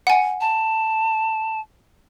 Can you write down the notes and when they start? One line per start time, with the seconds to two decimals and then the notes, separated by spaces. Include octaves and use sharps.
0.07 F#5 G#5
0.41 A5